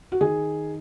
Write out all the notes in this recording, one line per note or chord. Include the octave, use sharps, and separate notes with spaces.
F#4
D#3 G#4